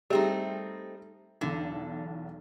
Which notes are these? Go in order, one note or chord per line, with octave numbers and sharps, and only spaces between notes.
G3 A3 C4 D#4 G4 G#4
B1 E2 D3